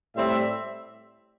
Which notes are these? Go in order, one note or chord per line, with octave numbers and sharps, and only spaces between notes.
A2 G3 C4 E5